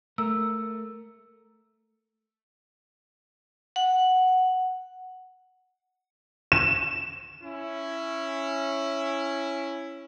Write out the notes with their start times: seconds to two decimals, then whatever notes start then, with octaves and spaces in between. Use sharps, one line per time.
0.18 A3 A#4 E6
3.76 F#5
6.52 E7
7.43 C#4 E4